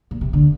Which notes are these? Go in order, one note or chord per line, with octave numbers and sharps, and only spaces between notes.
A#2
C3
D3